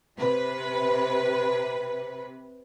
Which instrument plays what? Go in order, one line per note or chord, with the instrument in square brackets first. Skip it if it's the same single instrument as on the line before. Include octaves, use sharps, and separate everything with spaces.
[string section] C3 B4